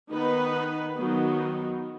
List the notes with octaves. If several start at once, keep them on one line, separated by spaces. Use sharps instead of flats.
D#3 B3 D#4 B4
D#3 F#3 B3 D#4